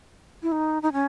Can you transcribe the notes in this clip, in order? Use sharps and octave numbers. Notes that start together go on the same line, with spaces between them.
E4
D#4
D#4
C#4